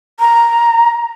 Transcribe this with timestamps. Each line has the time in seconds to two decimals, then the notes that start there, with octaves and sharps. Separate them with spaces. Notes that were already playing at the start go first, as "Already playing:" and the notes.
0.20 A#5